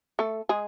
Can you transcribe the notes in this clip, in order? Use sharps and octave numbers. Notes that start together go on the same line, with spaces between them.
A3 A4
G#3 G#4